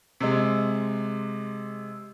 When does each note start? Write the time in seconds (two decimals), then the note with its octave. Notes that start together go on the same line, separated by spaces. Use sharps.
0.20 C3 G#3